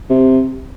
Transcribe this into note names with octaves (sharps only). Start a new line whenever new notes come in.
C3